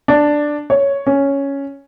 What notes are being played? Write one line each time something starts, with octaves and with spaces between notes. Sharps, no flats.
D4
C#5
C#4